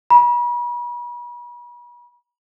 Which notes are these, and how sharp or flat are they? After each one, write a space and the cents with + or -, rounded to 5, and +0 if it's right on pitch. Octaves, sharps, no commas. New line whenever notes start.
B5 -40